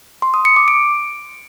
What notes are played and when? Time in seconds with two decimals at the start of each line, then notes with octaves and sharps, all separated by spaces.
0.22 C6
0.34 D#6
0.45 C#7
0.56 D6
0.68 D7